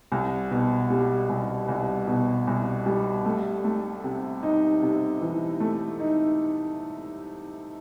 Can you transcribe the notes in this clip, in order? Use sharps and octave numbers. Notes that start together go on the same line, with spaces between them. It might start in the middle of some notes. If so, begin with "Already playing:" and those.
C2
B2
G3
C2
C2
B2
C2
G3
A3
A3
C3
D#4
C3
E3
A3
D#4